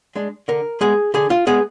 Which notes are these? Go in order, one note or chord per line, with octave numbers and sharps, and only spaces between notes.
G#3 D4
D3 A#4
G#3 B3 G#4
D3 G#4
F4
G#3 B3 G#4